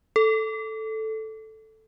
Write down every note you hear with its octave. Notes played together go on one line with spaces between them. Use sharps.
A4